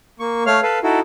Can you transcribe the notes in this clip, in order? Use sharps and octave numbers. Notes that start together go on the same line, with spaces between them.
A#3 C#6
A3 C#5 F5 F6
A4 B4 F5
D#4 E4 F#4 A4